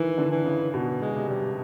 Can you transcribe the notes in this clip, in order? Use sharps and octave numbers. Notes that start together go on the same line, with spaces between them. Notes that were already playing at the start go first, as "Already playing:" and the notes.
Already playing: D#3 E3
D3
E3
C#3
B2
G#3
C3
G3